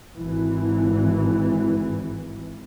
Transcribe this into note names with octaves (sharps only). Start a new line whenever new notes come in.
G#1 E3